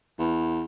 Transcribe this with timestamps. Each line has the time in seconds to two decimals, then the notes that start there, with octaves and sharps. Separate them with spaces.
0.19 E2